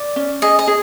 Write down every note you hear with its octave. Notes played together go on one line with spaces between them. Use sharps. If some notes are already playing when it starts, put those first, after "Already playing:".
Already playing: D5
C#4
G#4 D#5
D#5
G#4